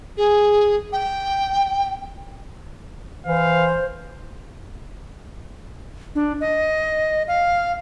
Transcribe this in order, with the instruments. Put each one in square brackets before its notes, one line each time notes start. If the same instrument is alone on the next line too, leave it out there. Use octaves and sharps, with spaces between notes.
[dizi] G#4
G5
[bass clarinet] E3 [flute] C5 [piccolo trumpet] F5
[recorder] D4
D#5
F5